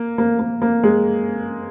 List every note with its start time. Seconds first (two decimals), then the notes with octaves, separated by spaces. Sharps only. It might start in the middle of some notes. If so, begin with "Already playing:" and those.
Already playing: A#3
0.18 A#3
0.39 A#3
0.62 A#3
0.83 G#3